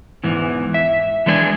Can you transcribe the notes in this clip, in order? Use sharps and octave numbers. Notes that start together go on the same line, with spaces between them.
E2 G#2 E3
E5
E3 G#3 D4 A4 G#5